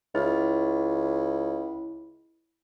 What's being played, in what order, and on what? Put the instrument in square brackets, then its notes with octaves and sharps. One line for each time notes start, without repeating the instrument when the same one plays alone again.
[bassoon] C#2 [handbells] E4